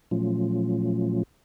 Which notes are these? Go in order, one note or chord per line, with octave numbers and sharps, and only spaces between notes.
A#2 F3 F#3 A3 C#4 F4